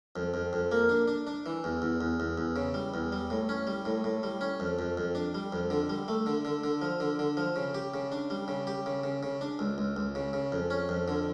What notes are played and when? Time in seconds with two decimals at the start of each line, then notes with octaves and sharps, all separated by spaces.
0.16 F2
0.34 F2
0.53 F2
0.72 A#3
0.89 D4
1.08 D4
1.27 D4
1.46 E3
1.64 E2
1.82 E2
2.01 E2
2.20 E2
2.38 E2
2.56 C#3
2.74 G3
2.94 E2
3.12 G3
3.30 A2
3.49 C#4
3.67 G3
3.85 A2
4.04 A2
4.23 G3
4.41 C#4
4.60 F2
4.79 F2
4.97 F2
5.15 D4
5.34 G3
5.52 F2
5.70 D3
5.89 G3
6.08 A3
6.26 D3
6.45 D3
6.64 D3
6.82 F3
7.00 D3
7.19 D3
7.37 F3
7.56 C#3
7.74 G4
7.94 C#3
8.12 D4
8.30 G3
8.48 C#3
8.67 G4
8.86 C#3
9.04 C#3
9.23 C#3
9.41 D4
9.59 C#2
9.78 C#2
9.96 C#2
10.15 C#3
10.33 C#3
10.52 F2
10.70 C#4
10.89 F2
11.08 D3